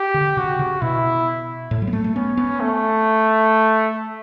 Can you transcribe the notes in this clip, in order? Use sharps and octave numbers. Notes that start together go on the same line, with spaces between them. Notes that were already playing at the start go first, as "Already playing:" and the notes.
Already playing: G4
D3
C#3 F#4
C#3
B2 E4
A2
F#3
B3
A3
A3
B3 C#4
B3
A3